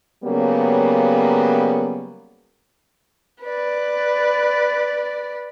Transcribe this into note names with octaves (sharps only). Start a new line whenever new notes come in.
C#3 F#3 G3 A#3 B3
B4 D5